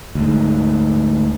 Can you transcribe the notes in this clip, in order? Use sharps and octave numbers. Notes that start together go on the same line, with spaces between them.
D2 G#2